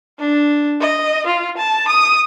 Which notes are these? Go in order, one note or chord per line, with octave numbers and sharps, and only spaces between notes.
D4
D#5
F4
A5
D#6